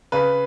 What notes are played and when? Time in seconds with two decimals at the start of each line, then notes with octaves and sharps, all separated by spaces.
0.12 C#3 B4